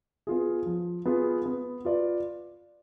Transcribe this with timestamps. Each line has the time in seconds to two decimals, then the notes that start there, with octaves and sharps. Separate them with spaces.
0.27 B3 F4 G#4
0.66 F3
1.05 B3 F4 G#4
1.46 B3
1.85 F4 B4 D5